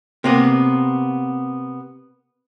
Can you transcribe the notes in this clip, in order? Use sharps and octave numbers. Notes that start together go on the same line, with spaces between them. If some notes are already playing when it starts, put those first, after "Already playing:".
C3 A#3 B3